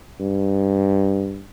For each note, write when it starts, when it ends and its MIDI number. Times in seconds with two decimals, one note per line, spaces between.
0.20 1.45 43